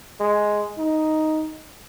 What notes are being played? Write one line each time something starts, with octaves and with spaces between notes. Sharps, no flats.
G#3
D#4